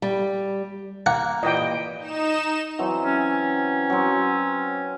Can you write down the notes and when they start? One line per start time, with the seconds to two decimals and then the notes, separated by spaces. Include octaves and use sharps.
0.02 G3
1.06 A#3 F#5
1.43 A#2 E3 G4 D#5 G5
1.97 D#4 E7
2.79 E3 F#3 C4
3.02 C#4
3.90 F#3 C4